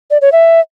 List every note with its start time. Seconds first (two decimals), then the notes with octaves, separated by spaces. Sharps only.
0.11 D5
0.21 C#5
0.32 E5